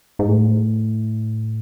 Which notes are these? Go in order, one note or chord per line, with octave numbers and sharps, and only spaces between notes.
G#2
A2